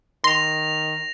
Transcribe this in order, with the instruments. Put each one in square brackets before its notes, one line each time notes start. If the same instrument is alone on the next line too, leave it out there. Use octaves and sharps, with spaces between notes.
[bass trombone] D#3 [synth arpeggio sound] C6 [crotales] A#6 F7